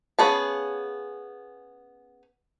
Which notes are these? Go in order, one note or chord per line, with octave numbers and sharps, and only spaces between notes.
B3 C#4 G#4 F5 A5